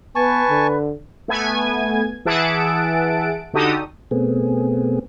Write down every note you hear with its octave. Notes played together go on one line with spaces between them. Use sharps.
B3 B4 G#5 A5 C#6
D3
A3 B3 G#5 G#6
E3 G#4 E5 F#5 A5 D7
D3 D#4 F#4 G4 A4 D#6
B2 A3 B3 C4 G#4